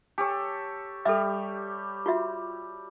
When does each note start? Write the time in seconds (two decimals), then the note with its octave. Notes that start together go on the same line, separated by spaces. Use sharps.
0.18 G4 A4 C#5 G#5
1.05 G3 A4 E5
2.06 F4 F#4 E5